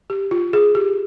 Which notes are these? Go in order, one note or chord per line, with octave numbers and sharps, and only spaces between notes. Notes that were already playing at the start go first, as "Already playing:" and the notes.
G4
F4
G#4
G4